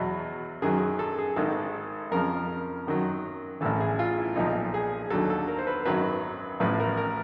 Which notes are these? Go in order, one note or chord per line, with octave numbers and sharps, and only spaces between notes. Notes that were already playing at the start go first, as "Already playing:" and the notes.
Already playing: E2 B2 F#3 F#4
F#2 D#3 F#3 G#4
G#4
A4
G#4
G#1 G#2 D#3 A4
F2 C#3 F3 A#4
F#2 D#3 F#3
A1 A2 E3 A4
G#4
F4
E4
B1 A#2 F3 D#4
G#4
D#2 D3 F#3 A4
A4
A#4
C5
B4
G#1 F#2 D#3 F#3 B4
A1 A2 F3 B4
A#4
A#4